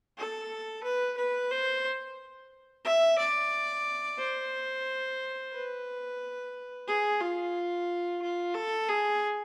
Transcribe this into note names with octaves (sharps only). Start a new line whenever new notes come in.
A4
B4
B4
C5
E5
D5
C5
B4
G#4
F4
F4
A4
G#4